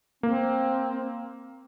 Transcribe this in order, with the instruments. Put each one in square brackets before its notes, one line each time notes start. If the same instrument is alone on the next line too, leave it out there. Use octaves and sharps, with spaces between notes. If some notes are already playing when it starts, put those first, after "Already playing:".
[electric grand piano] A#3 [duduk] C4